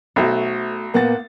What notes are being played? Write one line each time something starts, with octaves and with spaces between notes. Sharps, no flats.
B1 A3 F#4 A4 C5 E5
A#2 A#3 B3 F#5 A6